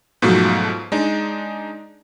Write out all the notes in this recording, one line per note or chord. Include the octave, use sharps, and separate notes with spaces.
G#2 B2 F3 F#3 A3
G#3 D4 D#4